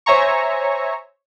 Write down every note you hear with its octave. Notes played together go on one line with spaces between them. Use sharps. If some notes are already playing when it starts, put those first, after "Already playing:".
C5 C#5 E5 G#5 A#5 C#6